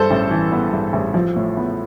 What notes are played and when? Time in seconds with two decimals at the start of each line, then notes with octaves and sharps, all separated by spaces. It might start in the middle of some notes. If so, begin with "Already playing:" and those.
Already playing: G2 A4 C5
0.11 A1
0.31 E3
0.52 B3
0.73 G2
0.93 A1
1.14 F3
1.36 A2
1.57 B3